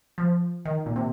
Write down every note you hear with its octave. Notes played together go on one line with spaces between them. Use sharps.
F3
D#3
A#2
C3